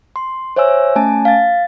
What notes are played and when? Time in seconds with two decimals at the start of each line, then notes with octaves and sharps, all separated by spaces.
0.16 C6
0.56 C5 C#5 E5 G#5 E6
0.96 A3 C#4 G#5 A5
1.25 F5 A6